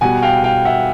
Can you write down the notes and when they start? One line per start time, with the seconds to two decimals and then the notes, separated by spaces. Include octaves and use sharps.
0.01 B2 G3 F#5 G#5
0.22 F5 G5
0.44 F5 G5
0.65 E5 F#5